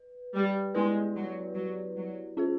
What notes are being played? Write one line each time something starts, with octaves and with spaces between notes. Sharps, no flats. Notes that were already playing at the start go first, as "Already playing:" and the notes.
Already playing: B4
G3
G#3 B3 E4 G4 B4 D5
F#3
F#3
F#3
C#4 F4 G#4 C5